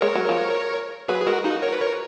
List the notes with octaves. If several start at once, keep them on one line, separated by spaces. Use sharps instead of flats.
G#3 A#4 C#5
F#3
F3
F#3 G#4 B4
G#4
G#3 F#4 A#4
F3 D#4 F#4
A#4 C#5
B4
A#4 C#5